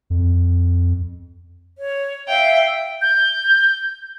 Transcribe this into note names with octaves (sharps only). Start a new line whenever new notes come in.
F2
C#5
E5 F5 G5
G6